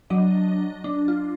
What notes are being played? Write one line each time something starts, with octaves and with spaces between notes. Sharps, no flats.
F#3 D4 D#5
D4
F4